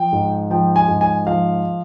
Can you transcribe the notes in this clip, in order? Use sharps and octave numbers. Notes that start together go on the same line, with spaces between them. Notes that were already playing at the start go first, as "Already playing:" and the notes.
Already playing: F3 G5
G#2
F3 G5
G#5
G#2
G#5
F3 F5